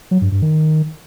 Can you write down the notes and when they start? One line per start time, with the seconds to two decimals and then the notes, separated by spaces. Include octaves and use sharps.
0.11 F#3
0.21 G2
0.32 G2
0.42 D#3